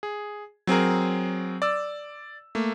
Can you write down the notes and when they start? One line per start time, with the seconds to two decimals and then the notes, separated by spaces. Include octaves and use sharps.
0.03 G#4
0.67 F#3 C4 G#4 A#4
1.62 D5 E6
2.55 A3 A#3